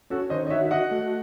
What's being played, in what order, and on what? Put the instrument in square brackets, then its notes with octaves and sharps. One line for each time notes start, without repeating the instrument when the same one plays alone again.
[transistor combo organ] C#4 [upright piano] F#4 A4
[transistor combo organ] D#3 [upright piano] C5 D#5
[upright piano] D#5
[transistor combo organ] F#4 [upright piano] C#5 E5
[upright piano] E5
[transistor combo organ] F#4 [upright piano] D#5 F#5
[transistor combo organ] A3